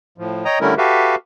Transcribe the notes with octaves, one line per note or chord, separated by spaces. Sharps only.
A2 F3
C#5 D#5 G5 A#5 D#6
D3 G3 A3 C#4 E4 A#4
F#4 G4 A4 B4 E5 F5